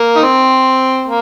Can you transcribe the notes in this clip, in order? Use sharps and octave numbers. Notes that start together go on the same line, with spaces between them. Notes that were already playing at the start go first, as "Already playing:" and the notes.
Already playing: A#3
D#4
C4
A#3